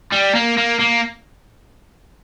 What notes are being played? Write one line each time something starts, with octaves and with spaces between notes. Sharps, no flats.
G3
A#3
A#3
A#3